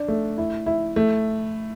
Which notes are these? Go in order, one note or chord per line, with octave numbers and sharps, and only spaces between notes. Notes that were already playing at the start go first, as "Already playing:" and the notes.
Already playing: D4
A3
E4
E4
A3